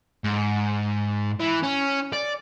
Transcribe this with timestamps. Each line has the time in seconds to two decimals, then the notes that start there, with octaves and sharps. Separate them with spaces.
0.24 G#2
1.40 E3
1.63 C#4
2.13 D5